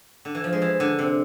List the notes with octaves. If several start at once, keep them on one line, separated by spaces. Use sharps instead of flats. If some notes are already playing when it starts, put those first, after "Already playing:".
D3
E3
F3
G#3
E3
D3
C3